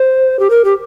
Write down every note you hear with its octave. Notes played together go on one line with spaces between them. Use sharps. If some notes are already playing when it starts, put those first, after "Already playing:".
Already playing: C5
G4
A#4
G4